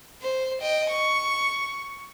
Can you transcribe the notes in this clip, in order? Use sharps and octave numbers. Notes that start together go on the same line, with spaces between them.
C5
D#5 G5
C#6